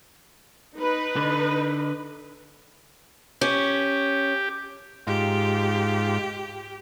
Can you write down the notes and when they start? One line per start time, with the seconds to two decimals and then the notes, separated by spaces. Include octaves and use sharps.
0.76 D#4 B4
1.16 D3
3.41 C#4 G4
5.07 G#2 F4 G4